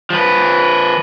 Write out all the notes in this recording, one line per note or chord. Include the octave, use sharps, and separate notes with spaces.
F3 B4